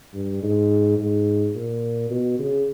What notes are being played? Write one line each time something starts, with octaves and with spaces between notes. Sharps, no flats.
G2
G#2
G#2
A#2
B2
C#3